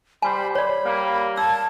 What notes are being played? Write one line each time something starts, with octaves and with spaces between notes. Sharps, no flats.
G3 C5 G#5 B5
C#5 D5 B5
G3 A#3
A5 E6 G#6